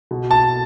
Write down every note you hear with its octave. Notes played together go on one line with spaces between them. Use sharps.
B2
A5